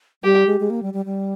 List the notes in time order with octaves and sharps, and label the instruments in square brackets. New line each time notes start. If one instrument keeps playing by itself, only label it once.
[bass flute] G3 [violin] G4
[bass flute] G#3
G#3
A#3
G3
G3
G3